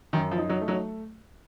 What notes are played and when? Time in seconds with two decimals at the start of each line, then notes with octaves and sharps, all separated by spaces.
0.13 F#2 D#3
0.31 F3
0.38 D#4
0.50 F#3
0.61 A3
0.68 F#3